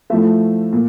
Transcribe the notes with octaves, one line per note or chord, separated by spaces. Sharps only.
A2 F3 A3 E5
A#2